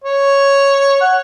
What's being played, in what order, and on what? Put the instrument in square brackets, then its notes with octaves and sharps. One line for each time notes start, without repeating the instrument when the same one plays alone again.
[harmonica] C#5
F#5